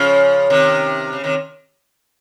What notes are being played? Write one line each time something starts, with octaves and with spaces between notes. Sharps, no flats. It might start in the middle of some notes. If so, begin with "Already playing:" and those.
Already playing: C#3 F3
C3 D#3
C#3
C3 D#3